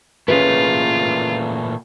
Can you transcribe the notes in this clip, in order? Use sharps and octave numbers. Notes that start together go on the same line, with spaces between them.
A#2 E3 A3 C#4 F4 G#4 B4